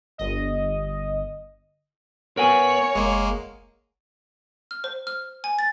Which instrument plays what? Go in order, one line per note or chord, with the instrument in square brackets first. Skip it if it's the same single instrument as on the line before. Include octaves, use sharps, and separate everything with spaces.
[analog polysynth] G1 D#5
[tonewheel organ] B3 B4 [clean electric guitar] A#4 F#5 G#5 [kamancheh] C#5
[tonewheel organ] F#1 [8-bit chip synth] G#3 A#3
[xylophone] F6
C5
F6
G#5
A6